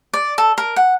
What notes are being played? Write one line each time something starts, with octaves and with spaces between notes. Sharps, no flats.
D5
A4
A#4
F#5